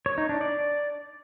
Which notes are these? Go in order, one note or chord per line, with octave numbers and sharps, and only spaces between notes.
C#5
D#4
D4
D5